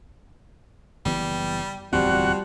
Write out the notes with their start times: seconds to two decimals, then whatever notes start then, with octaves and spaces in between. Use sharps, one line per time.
1.05 F#1 E3 G3 B3
1.93 D1 E2 F3 G3 C4 F#4 F#5